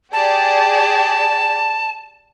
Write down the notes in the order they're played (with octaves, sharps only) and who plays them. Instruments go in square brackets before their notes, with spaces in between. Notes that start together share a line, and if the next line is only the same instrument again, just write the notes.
[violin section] G4 G#4 D5 [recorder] A5